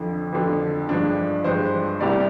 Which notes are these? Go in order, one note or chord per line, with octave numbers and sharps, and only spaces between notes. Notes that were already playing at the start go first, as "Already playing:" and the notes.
Already playing: F2 D3 F3
F2 D3 F3
G2 F3 G#3 D4
G2 F3 G#3 C5
C2 C3 G3 D5